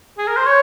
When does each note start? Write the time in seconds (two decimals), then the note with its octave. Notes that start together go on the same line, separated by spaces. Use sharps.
0.18 G#4
0.27 A#4
0.36 C5
0.46 C#5